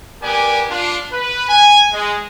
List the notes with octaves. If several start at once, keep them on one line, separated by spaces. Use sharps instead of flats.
G3 B3 G4 A#4 D5 G#5
D4 F4
B4
G#5
G#3